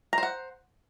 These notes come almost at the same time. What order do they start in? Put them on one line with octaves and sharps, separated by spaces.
A#5 C5 F#5